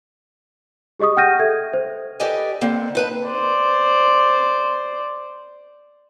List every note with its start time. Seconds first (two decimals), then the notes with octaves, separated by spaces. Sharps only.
1.00 G4 G#4 D#5 C#6 D#6
1.17 F#5 G5 F6 G6 A#6 D#7
1.39 A4 E5 G#6
1.73 C5
2.20 G4 A4 B4 D5 D#5 G#5
2.61 D3 A#3 C4
2.95 D#4 B4 A5
3.28 C5 D5